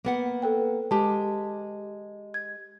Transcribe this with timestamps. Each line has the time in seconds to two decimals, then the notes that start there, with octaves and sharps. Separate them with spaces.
0.05 A#3 B3 F#5
0.42 A4 B4 G5
0.91 G#3 G4 A5
2.34 G#6